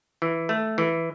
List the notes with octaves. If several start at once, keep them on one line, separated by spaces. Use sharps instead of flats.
E3
A3
E3